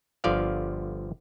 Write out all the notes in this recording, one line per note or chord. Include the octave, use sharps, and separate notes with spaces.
G1 D3 F3 D5 F5